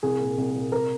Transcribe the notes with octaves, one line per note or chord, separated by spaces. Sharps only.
C2 G#4
A#2
C2
A#2
C2 A#4